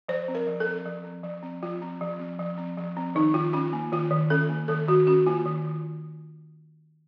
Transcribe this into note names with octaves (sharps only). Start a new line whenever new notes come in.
F3 C5
C4
A#4
F3
A4
C4
F3
C4
F3
C4
F3 F4
C4
F3
C4
F3
C4
F3
C4
D#3 D#4
D#3 F4
C#4 F4
A#3
D#3 F4
D#3
C#4 A4
A#3
D#3 A4
D#3 F#4
C#4 F#4
A#3 F4
D#3